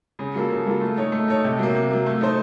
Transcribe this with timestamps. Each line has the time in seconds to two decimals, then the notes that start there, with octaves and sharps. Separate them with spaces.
0.19 C#3
0.35 F#3 A#3 F4 A4
0.50 C#3
0.67 F#3 A#3 F4 A4
0.81 A3
0.97 D#4 A4 C#5
1.12 A3
1.28 D#4 A4 C#5
1.44 C3
1.59 F#3 A#3
1.75 C3
1.91 F#3 A#3
2.06 A3
2.21 D#4 A4 C5